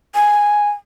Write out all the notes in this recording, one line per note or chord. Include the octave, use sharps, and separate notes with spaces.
G#5